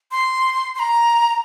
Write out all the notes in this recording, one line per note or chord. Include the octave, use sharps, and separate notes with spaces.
C6
C6
A#5